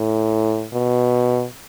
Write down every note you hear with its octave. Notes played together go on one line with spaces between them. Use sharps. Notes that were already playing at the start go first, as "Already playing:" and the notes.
Already playing: A2
B2